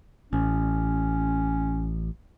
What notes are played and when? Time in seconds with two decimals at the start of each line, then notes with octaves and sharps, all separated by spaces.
0.33 A1 C#4